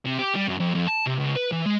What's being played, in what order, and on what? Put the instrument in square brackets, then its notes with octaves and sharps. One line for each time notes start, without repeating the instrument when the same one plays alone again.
[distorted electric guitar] C3
G4
G3
F#2
F2
F2
A5
C3
C#2
B4
E3
G#3